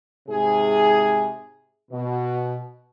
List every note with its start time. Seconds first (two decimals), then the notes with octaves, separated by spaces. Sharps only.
0.28 G#2 C3 G#4
1.91 B2